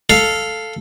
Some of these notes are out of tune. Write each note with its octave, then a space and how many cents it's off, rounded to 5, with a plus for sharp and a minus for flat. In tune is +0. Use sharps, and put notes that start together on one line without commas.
A4 +0 F5 +0